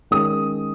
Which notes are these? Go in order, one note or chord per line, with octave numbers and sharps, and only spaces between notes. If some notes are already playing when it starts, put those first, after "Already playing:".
D#3 G#3 C#4 D#6